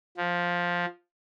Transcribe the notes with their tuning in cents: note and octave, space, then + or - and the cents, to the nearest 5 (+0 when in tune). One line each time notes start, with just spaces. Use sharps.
F3 +5